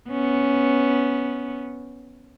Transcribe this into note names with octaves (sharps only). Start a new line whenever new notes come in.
B3 C#4